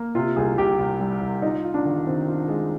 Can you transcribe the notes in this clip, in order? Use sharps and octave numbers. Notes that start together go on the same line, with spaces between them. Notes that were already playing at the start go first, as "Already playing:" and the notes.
Already playing: A#3
C3 F4
C2 G#4
C2 G4
C2
G3
C2
D#4 F4
F4
D4
D#3
D#3 C4
F4
G#3